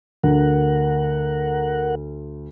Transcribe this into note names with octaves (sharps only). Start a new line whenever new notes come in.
D2 A#4 F#5